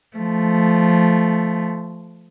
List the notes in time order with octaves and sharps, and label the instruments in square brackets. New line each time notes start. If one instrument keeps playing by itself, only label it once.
[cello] F3 A3